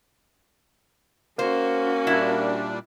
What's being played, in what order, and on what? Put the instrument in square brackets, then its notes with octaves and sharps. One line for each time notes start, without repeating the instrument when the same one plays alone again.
[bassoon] A#3 [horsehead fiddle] C#4 F#4 [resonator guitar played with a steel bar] C5
[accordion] A#2 G3 D4 [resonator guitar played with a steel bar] E4